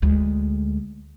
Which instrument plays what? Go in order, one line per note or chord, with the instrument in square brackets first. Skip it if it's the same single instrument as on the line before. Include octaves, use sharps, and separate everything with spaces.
[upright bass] D2 G#3